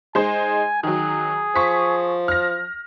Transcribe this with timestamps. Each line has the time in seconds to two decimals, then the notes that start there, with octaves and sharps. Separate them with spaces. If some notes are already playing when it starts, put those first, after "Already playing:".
0.15 G#3 D#4 C5 G#5
0.83 D#3 F#3 G#4
1.56 F3 C#6 B6
2.28 F6 A#6